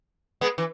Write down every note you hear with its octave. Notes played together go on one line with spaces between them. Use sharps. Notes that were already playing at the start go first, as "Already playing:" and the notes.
G#3 B3
E3